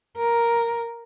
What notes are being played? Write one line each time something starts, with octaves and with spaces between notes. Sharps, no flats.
A#4